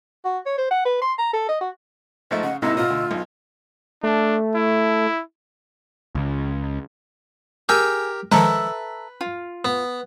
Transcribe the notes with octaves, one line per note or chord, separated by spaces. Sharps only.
F#4
C#5
C5
F#5
B4
C6
A#5
A4
D#5
F#4
G#2 F3 A3 D#5
C#3 F#5
G#2 C3 A#3 E4 D#5 E6
B2 F4 D#5
D2
B1 D#4
A3 D4
E4
C#2
G4 G#4 A#4 E6 G6
D#3 F3 G#3 A4 B4 E5 A#5
F4
B3